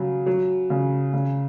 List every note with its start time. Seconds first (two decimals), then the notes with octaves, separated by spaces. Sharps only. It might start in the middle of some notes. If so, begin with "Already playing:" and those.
Already playing: C#3 F#3
0.26 F#3
0.70 C#3
1.13 C#3